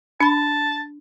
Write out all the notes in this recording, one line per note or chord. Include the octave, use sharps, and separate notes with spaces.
D4 A5 B5